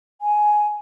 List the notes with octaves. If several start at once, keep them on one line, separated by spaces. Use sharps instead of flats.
G#5